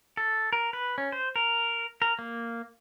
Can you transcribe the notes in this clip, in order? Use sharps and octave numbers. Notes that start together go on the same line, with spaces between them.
A4
A#4
B4
C#4
C5
A#4
A#4
A#3